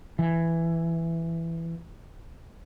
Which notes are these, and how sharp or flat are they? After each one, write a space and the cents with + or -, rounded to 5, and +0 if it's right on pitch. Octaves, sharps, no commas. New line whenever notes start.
E3 +10